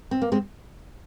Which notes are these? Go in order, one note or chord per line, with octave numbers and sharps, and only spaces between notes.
C4
A#3
G#3 C4